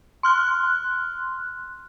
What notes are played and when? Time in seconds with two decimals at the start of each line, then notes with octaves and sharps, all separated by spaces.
0.23 C6 F6 F#6